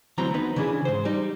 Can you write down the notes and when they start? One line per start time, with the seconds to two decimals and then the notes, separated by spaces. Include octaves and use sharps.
0.18 D2 E3 F#3 C4 A#5
0.34 B3 D#4 B4
0.56 C#3 E3 D4 G#4
0.85 G#2 C5
1.05 G3 D#4